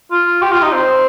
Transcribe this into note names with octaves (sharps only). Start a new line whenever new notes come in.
F4
G4
F4
D#4
C4